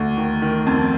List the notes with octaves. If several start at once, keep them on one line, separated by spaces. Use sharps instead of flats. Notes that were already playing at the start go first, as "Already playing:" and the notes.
Already playing: D2
D#3
D#3
F2